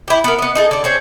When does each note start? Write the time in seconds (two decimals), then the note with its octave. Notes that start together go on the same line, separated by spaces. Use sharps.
0.08 E4 G4
0.24 B3 A#4
0.39 B3 D#5
0.55 D#4 G#4 A4
0.71 D3 D4
0.84 C4 C#4 G#4